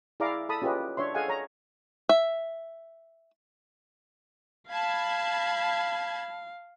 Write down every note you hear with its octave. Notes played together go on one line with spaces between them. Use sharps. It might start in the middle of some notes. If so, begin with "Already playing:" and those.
E4 G#4 D5 F5 A#5 D6
A4 A5 B5 D#6
C#4 F4 G4 G#4 B4 D#5
D4 C#5 E5 C6
G#4 A4 D#5 F5 F#5 G#5
C#5 A#5
E5
F5 A5 B5 G#6